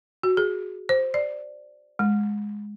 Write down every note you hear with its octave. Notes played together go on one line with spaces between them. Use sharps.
F#4
G#4
C5
D5
G#3